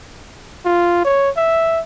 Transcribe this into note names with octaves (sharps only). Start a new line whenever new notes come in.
F4
C#5
E5